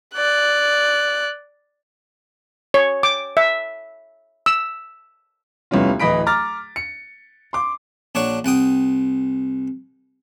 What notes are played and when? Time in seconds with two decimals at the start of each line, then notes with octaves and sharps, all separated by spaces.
0.15 D5 F#6
2.74 C#5
3.03 D6
3.37 E5
4.46 E6
5.71 F1 C2 B3 C#4 F4
6.00 D1 E3 D#5 B5 B6 D7
6.26 A#5 D6 F6 A6
6.76 C#7
7.53 C6 D6
8.15 A#1 D4 C#5 F#5 C#6
8.45 C2 F#5 G5 D#6